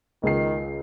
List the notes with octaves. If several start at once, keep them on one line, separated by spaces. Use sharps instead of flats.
C#2 D#3 C7